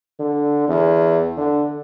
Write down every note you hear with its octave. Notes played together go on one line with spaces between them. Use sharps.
D3
E2
D3